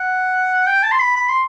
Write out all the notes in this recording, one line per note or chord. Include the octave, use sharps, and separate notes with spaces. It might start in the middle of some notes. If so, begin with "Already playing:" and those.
Already playing: F#5
G5
A5
C6
B5
B5
C6